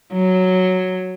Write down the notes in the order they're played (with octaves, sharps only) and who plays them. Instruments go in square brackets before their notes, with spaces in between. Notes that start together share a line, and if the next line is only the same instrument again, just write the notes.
[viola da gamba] F#3